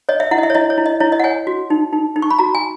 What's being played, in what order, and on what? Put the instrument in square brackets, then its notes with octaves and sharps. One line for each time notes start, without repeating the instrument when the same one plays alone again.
[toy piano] C#5 D#5
E5
E4 F#5
D#5
E5
C#5
E4 D#5
C#5
E4
D#5
E4 C#5
D#5
F#5
C#5 G#5
F#4
D#4
D#4
D#4
C#6
B5
F#4 A#5
G#5